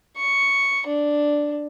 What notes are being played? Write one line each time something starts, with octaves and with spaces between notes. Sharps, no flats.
C#6
D4